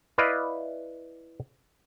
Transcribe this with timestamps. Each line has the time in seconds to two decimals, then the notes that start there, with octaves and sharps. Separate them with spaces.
0.18 E4 B4 D5 D#5 F5